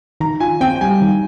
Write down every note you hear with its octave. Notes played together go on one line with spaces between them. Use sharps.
D#3 A#5
F4 G#5
C4 G5
G5
G3 G#5
D#3